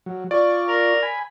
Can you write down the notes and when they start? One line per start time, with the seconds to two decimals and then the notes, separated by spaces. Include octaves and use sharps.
0.06 F#3
0.31 F4 D5 C#6
0.68 A#4
1.03 G#5 B5